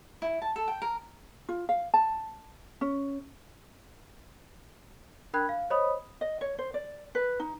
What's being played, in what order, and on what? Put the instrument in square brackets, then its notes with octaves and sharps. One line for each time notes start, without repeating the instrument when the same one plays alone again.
[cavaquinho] E4
A5
A4
G5
A#4
[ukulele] F4
F5
A5
C#4
[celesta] D4 A#4 G5 B5 F#6 G#6
F5
C5 C#5 D#5 B5 D#6
[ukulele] D#5
C#5
C5
D5
B4
D#4